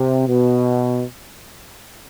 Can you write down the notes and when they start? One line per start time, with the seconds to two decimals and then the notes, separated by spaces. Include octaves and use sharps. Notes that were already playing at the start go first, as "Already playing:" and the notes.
Already playing: C3
0.27 B2